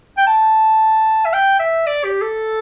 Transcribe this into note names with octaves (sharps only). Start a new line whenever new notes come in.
G5
A5
E5
G5
E5
D5
G4
A4